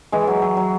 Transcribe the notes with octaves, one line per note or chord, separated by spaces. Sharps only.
E3 G#3
F#3
F#3
F#3